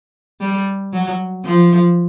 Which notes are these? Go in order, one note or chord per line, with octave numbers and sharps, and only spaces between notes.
G3
F#3
F3